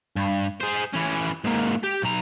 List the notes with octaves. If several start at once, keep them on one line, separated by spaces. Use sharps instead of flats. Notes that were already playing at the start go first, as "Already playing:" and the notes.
G2
G#4 C5
E3 C#4
G#2 A#3
G4
B1 A#5